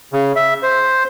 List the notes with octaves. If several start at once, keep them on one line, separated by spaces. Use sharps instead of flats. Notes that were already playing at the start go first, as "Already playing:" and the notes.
C#3
E5
C5